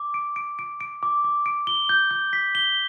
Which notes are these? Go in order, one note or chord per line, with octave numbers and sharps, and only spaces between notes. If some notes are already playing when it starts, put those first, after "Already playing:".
Already playing: D6
D7
D7
D7
D7
D6
D6
D7
G7
G6
G6
B6
G7